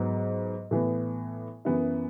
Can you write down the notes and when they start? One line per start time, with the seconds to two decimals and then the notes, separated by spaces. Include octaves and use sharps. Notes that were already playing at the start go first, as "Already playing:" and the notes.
Already playing: G#2 F#3 B3
0.71 A2 E3 B3
1.65 F#2 E3 B3 E4